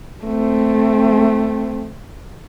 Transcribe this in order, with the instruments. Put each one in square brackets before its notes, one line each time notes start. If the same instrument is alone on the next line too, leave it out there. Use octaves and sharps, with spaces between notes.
[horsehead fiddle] A3 C4